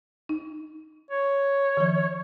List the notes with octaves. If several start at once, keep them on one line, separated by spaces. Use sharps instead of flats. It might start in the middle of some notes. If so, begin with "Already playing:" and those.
D#4
C#5
D#3 F3